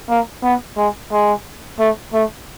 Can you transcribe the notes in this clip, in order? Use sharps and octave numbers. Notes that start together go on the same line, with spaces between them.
A#3
B3
G#3
G#3
A3
A3